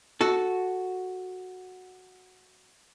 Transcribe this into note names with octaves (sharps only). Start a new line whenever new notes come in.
F#4 A4